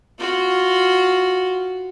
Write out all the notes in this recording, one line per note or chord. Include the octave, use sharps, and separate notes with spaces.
F4 F#4